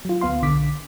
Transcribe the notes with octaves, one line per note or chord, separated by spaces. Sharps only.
F#3 F4
D2 B3 F5 C6
B1 D3 D6 B6